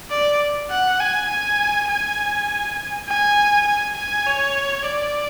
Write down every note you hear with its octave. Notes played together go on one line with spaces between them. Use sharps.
D5
F#5
G#5
G#5
G#5
G#5
G#5
G#5
C#5
D5